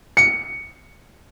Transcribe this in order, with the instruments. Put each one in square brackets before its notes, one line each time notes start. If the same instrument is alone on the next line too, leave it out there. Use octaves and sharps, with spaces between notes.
[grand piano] C#7